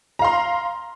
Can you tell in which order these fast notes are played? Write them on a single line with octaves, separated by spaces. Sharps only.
A#5 F5 C6